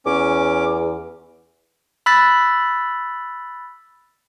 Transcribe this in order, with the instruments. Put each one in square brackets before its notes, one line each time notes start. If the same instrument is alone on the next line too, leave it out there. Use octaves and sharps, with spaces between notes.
[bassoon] E2 [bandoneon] C#4 D6
[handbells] B5 E6 F#6 A6 B6